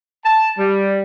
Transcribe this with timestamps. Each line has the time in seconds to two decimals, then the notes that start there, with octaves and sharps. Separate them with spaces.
0.25 A5
0.58 G3